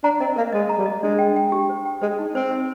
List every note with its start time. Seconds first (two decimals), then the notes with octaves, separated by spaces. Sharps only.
0.04 D4 A#5
0.20 C4 D#5
0.36 A#3 A#4
0.53 G#3 D#5
0.69 A#5
0.78 G3
0.86 D#5
1.03 G#3 D4
1.19 G5
1.36 G5
1.52 G4
1.69 C5
1.85 G5
2.02 G#3 C5
2.19 D#4
2.35 C4 C5
2.51 C5